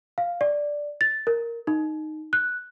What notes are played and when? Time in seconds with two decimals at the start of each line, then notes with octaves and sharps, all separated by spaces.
0.18 F5
0.41 D5
1.01 A6
1.27 A#4
1.67 D#4
2.33 F#6